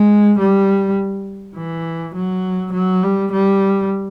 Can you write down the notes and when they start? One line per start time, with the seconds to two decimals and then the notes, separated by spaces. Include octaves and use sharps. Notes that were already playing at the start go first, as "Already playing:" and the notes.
Already playing: G#3
0.39 G3
1.56 E3
2.15 F#3
2.73 F#3
3.03 G3
3.32 G3